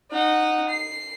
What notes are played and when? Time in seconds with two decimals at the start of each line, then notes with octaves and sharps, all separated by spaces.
0.12 D#4 F#5
0.69 C7